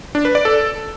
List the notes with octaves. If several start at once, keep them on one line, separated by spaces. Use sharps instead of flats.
D4
B4
D5
A4